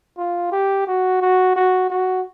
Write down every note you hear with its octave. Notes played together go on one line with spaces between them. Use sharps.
F4
G4
F#4
F#4
F#4
F#4